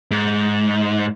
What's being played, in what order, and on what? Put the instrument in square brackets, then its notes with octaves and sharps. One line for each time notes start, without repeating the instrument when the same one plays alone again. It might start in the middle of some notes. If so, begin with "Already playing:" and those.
[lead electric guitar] G#2